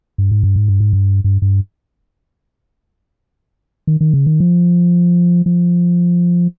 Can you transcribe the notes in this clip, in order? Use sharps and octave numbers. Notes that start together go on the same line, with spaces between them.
G2
G#2
G2
G#2
G2
G#2
G2
G2
G2
D#3
D#3
C#3
D#3
F3
F3